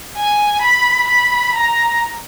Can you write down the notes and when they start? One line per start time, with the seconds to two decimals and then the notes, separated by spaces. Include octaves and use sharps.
0.16 G#5
0.62 B5
1.08 B5
1.55 A#5